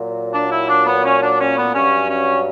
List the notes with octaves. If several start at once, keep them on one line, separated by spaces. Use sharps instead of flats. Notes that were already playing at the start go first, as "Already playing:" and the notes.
Already playing: A#2 F#3
D4
E4
D4
B3
C#4
D4
C#4
B3
G2 F#3 C#4
C#4